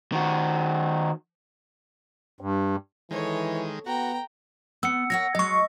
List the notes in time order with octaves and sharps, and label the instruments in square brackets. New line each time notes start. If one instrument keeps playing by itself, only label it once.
[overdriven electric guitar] D#3 F#4
[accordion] G2
[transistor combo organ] D#3 G#3 [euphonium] E3 [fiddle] A4 C#5
[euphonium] B3 [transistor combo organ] F#4 [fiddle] G5 A#5
[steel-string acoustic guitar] B3 [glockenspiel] E6 C#7
[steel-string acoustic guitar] A#4 C#5 F#5 [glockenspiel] A#6
[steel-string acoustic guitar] F#3 G#3 [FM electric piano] D#5 C#6